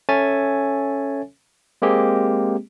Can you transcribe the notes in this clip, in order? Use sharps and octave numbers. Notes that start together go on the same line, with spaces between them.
C#4 A4 C#5 E5 G#5 A6
G#3 A#3 C4 G4 G#4